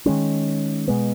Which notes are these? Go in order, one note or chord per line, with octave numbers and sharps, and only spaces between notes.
D#3 G#3 C#4
B2 G#3 B3